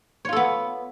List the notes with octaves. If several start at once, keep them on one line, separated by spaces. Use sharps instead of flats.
B3 F4 A4 C#5